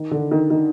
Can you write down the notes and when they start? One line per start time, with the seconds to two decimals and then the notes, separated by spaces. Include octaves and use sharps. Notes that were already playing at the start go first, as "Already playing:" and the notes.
Already playing: D#3
0.11 D3
0.31 D#3
0.50 D#3